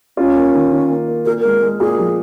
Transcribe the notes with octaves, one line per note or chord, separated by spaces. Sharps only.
C#4 F4
A#3
D#3
D#3
A#3
A#3
A#2 A#4
G#3 A#4
G#3
A#2 G#4
F3